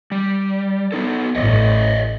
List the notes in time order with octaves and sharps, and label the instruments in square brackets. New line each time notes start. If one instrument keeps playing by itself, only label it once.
[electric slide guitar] G3
B3 D#4 A4
[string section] A1 [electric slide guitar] C#5 D#5 E5